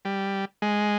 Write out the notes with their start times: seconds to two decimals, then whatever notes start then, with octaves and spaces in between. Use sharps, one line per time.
0.05 G3
0.62 G#3